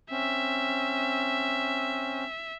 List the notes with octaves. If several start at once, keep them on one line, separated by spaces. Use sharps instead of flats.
C4 C#4 E5